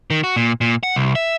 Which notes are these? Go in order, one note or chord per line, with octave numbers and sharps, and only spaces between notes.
D#3
F#4
A#2
A#2
F#5
C2
E5